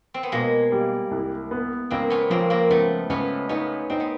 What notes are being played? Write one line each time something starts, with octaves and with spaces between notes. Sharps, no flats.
C4
B3
B2 G#3 A#3
G3
C2
B3
C#2 A#3 C4
B3 C#4
F3 A#3 C4
A#3 C4
C#2 A3 B3
C#2 B3 C#4
B3 C#4 D#4
C4 D#4
B3